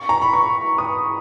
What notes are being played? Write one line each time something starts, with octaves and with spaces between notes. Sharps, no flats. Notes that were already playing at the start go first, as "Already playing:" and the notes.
Already playing: C#6
A#5
B5
C#6
D#6